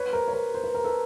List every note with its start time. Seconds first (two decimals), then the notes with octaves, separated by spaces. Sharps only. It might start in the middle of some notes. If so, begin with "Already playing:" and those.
Already playing: B4 C#5
0.13 A#4 C5
0.28 C#5
0.33 A#4 C5
0.54 C5
0.64 B4
0.74 A#4
0.84 A4 B4